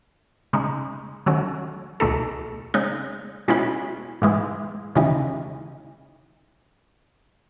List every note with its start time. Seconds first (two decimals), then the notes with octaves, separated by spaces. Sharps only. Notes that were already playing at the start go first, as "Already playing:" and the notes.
0.53 C#3 G#3 D#4
1.26 D#3 F#3 A3 C#4 F#4
2.00 C#2 B2 A3 D#4 A4
2.74 C#3 G#3 D#4
3.48 B2 G#3 C#4 E4 B4
4.22 G#2 E3 G#3
4.95 D#2 C#3 E3 G#3 D#4